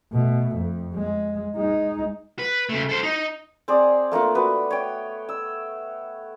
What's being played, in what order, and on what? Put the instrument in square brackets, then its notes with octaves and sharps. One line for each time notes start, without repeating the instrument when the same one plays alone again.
[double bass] B2 A3
F2
G#3
G#3 D#4
[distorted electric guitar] B4
C#3 A3
A4 C5
D#4
[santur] C4 G#4 D5
A3 A#3 D4 F4
B3 F#4 B4
C#5 G5
E6